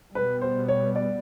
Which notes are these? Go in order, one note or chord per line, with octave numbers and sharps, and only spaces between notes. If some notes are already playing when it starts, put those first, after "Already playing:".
B2 G3 B3 B4
C5
C#5
D5